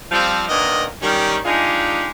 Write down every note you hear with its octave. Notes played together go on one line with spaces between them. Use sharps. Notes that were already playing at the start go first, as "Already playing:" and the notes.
F3 G3 C4
A#2 D#3 B3 D4 A#4 D#5
D#3 G3 C#4
G#3 D4 D#4 F4 G4 G#4